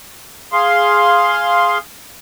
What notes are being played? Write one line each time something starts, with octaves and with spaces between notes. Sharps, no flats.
G#4 F5 C6